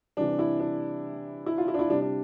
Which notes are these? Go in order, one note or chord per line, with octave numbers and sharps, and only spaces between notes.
C3 E3 G3 D4
E4
D4
E4
F4
E4
D4
E4
C3 G3 D4
D4